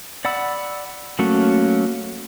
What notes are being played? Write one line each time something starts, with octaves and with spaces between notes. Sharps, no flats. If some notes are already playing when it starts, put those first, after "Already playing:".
D5 F#5 B5 E6
F#3 A3 A#3 C#4 F#4